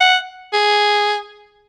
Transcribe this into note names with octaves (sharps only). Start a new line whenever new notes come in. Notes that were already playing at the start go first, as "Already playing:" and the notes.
F#5
G#4